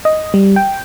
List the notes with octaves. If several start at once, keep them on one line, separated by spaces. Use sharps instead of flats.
D#5
G3
G5